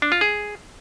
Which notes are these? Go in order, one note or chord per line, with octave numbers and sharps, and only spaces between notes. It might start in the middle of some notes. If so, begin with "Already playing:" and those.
D4
F4
G#4